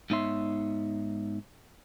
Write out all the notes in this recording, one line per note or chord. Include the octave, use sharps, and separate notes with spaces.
G#2 B3 D#4 C#5 E5 C6